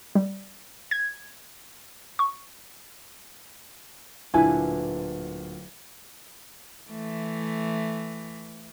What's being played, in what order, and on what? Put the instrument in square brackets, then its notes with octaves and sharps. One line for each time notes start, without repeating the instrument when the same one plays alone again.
[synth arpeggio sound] G3
G#6
C#6
[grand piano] D1 A#2 D3 [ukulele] E4 B4 G#5
[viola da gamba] E3 A3